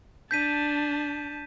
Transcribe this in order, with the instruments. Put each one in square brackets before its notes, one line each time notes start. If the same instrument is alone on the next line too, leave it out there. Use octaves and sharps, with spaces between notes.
[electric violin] D4 A5 [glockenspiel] G6 B6 D#7